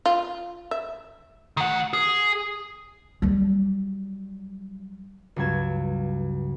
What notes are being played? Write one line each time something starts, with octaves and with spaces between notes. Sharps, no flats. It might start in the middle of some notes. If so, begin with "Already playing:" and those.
F4
E5
D#3 F#5
G#4
F#3 G3
C#2 G2 F#3 G#6 E7